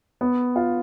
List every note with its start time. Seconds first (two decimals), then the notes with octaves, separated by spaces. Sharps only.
0.21 B3
0.56 F4